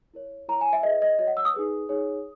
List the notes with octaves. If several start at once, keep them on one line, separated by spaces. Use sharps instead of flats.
E4 A#4 C#5
E4 A#4 C#5 A#5
G#5
E5
E4 G#4 B4 D#5
D#5
F#4 C#5 D#5
F#5
E6
D#6
D#4 G#4 B4
D#4 G#4 C#5